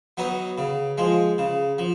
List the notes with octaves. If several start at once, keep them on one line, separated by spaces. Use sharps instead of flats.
F#3 B3 D#4
C#3
F3 G#3
C#3
F3